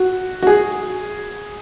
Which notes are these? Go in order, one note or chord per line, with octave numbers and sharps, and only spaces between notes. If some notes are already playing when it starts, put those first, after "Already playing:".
Already playing: F#4
F#4
G#4